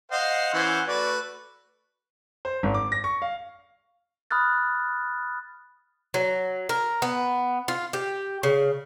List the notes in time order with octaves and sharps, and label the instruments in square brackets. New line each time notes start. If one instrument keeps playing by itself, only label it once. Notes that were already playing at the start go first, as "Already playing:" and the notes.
[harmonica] C5 D#5 F5 [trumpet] F#5
[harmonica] E3 C#4 C5
[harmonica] A3 F#4 B4 [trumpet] D5
[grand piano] C5
G#1
D6
A#6
C#6
F5
[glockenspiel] B5 D#6 F6 F#6 A6
[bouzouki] F#3
A#4
B3
F4
G4
C#3